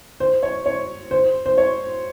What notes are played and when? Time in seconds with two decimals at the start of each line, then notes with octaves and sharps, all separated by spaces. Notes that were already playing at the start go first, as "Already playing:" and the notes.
0.20 C5
0.43 C#5
0.66 C#5
1.11 C5
1.46 C5
1.58 C#5